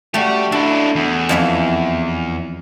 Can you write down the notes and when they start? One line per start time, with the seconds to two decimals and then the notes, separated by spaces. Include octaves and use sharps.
0.14 A3 F#4 G4 D5
0.52 D4 E4 A4
0.96 E2
1.29 F2 E4 E5